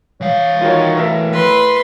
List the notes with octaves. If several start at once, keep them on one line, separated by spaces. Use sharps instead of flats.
E3 C#5 F5
D#3 F4 F#4 C#5
A2 A#4 E5
B4 C6